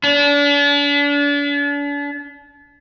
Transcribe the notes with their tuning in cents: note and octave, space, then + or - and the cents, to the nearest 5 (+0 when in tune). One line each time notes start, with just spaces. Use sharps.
D4 -40